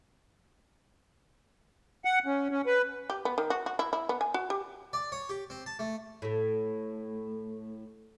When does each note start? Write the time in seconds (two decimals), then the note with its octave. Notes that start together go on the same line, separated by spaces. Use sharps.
2.05 F#5
2.26 C#4
2.51 C#4
2.66 B4
3.10 G4
3.25 B3
3.38 D#3
3.50 F#4
3.66 F#4
3.79 E4
3.93 E4
4.09 B3
4.21 G#5
4.34 F#4
4.50 G4
4.93 D5
5.12 C#5
5.29 G4
5.50 C4
5.66 A5
5.79 A3
6.22 A2 A3